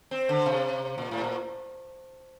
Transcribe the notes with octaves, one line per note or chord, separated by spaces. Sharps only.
C4
D3
C3
A#2
A2
C3
A#2